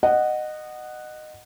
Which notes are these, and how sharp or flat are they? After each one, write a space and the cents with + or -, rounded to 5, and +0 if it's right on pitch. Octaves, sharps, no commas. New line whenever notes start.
D#5 -20 F#5 +0